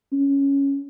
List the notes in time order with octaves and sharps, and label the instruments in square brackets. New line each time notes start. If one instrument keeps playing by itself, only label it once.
[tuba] C#4